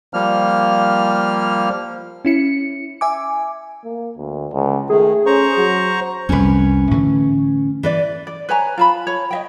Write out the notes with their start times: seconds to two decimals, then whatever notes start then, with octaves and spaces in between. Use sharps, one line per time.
0.14 F3 G3 A#3 F6
2.25 C#4 E4 C#7
3.01 E5 G#5 D6
3.84 A#3
4.17 D2
4.53 C#2
4.90 D#3 A3 G#4
5.26 C#4 C5 A#5 C#6
5.57 F#3
6.29 C2 F2 C#4 A#4 B4
6.91 A2 D3 E3
7.83 E3 B4 D5
8.27 D5
8.49 B4 C#5 G#5 A#5
8.78 F4 A5 B5
9.07 C#5
9.30 D#5 E5 G5